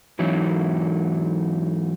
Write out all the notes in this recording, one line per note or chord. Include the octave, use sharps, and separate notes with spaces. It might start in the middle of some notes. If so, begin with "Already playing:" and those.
G#2 E3 F#3 D#4